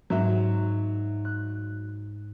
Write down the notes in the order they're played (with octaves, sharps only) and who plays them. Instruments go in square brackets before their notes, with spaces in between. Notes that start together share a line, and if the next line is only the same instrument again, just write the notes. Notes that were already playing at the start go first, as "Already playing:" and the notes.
[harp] G#2 [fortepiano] F#3 E5
[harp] F#6